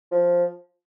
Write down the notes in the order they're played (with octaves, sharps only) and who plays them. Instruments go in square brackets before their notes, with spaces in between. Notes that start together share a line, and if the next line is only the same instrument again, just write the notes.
[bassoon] F3